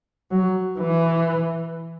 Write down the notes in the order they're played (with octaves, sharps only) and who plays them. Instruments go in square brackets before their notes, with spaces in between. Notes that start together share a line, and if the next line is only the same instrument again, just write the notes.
[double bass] F#3
E3